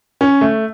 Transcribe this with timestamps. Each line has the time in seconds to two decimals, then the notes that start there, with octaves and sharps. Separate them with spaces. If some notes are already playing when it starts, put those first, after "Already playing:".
0.21 C#4
0.41 A3